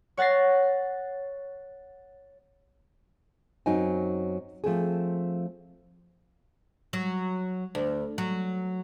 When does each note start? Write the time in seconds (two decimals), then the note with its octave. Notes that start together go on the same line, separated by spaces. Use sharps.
0.17 C#5 F#5 A6 A#6 C7
3.66 F#2 F#3 C4 D#4 G#5
4.64 F3 A3 C4 G#4
6.93 F#3
7.75 D2
8.18 F#3